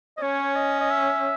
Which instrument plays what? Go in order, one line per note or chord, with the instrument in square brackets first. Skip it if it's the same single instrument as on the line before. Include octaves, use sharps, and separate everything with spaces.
[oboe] D#5
[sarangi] C#4 [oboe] C#5
[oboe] D#5
D#5
E5